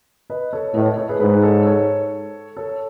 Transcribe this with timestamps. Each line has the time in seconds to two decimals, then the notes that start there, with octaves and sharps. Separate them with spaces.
0.30 B4 D#5
0.53 A4 C#5
0.74 A2 B4 D#5
0.86 A4 C#5
0.97 A4 C#5
1.09 G#4 B4
1.20 G#2 G#4 B4
1.43 A4 C#5
1.65 A4 C#5
2.57 A4 C#5